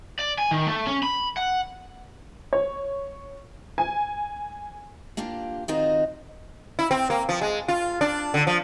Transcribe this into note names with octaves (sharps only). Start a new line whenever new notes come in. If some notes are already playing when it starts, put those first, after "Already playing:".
D5
G#5
D#3
A3
C#4
B5
F#5
C#5
G#5
A#3 D4 F4 G4
D#3 C4 D#4 F4 F#4 D#5
E4
C4
A#3
F3
G#3
F4
D4
D3
F3